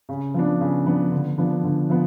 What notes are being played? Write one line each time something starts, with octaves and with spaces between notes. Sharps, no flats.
C#3
F3 B3 D4
C#3
F3 B3 D4
D3
F3 B3 D4
D3
F3 B3